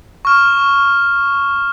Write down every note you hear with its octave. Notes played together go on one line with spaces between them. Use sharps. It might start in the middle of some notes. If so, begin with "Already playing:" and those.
C#6 F6 E7